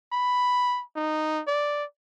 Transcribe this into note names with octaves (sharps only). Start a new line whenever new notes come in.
B5
D#4
D5